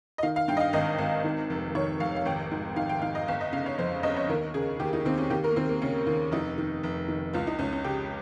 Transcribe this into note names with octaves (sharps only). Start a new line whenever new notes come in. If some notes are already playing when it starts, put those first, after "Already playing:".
D#5
D#3 F5
F5
G2 G5
D#5
F5
G#1 D#5
G#1
D#3
F1
D#3 C#5
F1 F5
F5
G#1 G5
G#2
G#2 F5
G5
G#2 F5
D#5
G1 F5
D#5
C#3 F5
C#5
F2 C5
G1 D#5
C#5
D#2 A#4
C#3 G#4
D#2 G4
D#4
D#2 C4
C#4
D#2 G4
A#4
A#3
D#2 C4
A#3
C#3 C#4
D#2
F1 D#4
D#3
F1
D#3
C#2 F4
D#4
C#2 C#4
C#4
C#3 G4